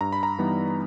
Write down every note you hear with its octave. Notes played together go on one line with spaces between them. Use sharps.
G2 A#5
B5
A#5
E3 G3 B3 D#4